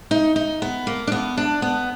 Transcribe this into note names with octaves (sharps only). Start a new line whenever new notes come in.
D#4
D#4
B3
A#3
D4
B3
D4
B3